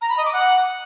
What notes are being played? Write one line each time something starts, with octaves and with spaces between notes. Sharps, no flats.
A#5
B5
D#5
D6
F#5